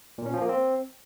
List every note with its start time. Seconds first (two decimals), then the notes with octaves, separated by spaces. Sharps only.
0.18 A#2
0.26 C#4
0.34 F3
0.41 A#3
0.49 C4